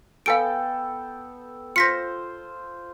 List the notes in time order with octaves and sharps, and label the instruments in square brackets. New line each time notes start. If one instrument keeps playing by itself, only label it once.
[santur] B3 A4 G5 [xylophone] F5 G#5 D7
[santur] F4 C5 [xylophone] A#6 B6 C#7